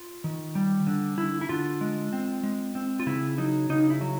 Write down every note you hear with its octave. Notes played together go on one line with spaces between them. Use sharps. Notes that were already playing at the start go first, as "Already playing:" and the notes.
Already playing: F4
D#3
G3
D3
D3 E4
E4
D3 F4
G#3
C4
G#3
C4
F4
C#3 E4
F#3 D#4
C#3 D#4
E4
F#3